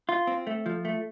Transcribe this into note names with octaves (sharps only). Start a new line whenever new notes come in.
F4
C4
A3
F3
A3